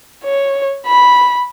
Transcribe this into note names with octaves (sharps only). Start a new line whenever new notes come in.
C#5
B5